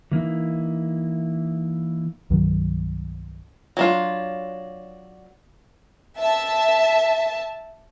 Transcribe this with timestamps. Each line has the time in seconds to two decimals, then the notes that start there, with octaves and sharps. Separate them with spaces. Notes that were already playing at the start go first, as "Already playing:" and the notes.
0.12 E3 A#3 D#4 E4
2.30 C2 G2 D#3 F#3
3.77 F#3 D4 F4
6.18 E5 A5